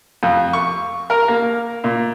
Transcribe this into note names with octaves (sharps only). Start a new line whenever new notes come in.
F2
C#6
A#4
A#3
A#2